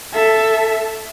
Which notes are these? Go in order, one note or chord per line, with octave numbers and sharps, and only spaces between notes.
A4 E5